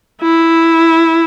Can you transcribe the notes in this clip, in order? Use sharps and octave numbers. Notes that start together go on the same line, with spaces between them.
E4